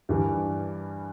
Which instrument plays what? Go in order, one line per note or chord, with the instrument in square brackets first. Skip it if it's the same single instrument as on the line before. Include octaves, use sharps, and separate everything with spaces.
[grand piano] G2 E3 G3 D4